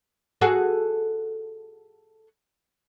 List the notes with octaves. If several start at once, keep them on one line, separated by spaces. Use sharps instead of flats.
F#4 G#4 A4